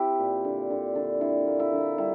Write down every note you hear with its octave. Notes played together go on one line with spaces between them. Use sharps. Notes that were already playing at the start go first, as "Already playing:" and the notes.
Already playing: C4 E4 G4
A#2
D3
D3
D3
D3 E4
A#3
E4
D3
G3 E4